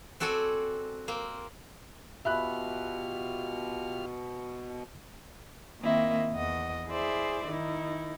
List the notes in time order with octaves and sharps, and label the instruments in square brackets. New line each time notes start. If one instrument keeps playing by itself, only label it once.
[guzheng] C4 F#4 A4 D5 G#5
A#3 C4
[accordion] B2 [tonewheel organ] F4 G4 F6 [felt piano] E5 B5 F#6
[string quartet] D#3 A#3 C4 E4 D#5
E2 D#5 F#5
E4 G#4 C5 D5 E5
D#3 D#4 E4